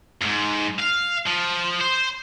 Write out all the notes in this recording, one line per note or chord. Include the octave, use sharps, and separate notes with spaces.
F2 G#2
F5
F3
C5